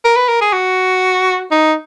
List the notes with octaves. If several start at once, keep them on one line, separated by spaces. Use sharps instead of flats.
A#4
B4
A#4
G#4
F#4
D#4